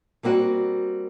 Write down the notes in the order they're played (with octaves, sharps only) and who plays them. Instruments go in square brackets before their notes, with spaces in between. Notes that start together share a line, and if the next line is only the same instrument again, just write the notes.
[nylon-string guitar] G3 A#3 C4 F#4